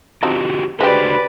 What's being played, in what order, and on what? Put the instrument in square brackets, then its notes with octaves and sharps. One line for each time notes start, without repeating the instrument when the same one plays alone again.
[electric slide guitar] D3 F#4 G4 [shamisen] F3 C4 D#4
[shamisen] G#3 G4 [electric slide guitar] D4 F#4 C5 [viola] B4 [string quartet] D5 B5